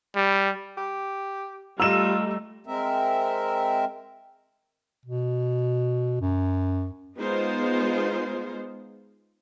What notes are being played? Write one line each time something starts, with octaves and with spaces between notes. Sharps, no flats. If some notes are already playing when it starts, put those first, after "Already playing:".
G3
G4
G3 A3 F4 D#5 A#5 E6 E7
G#3 C4 A#4 E5
B2
F#2
G#3 B3 D#4 F4 C5